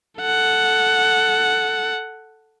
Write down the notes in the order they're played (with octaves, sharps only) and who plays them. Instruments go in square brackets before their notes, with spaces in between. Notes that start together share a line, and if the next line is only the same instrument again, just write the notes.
[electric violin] A4 F#5